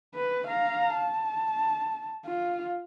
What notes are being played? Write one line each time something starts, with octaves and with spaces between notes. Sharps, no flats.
B4
F5 A#5
A5
F4